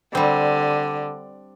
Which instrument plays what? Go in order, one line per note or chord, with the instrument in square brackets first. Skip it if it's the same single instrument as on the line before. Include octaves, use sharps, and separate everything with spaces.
[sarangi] D3 [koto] G3 C4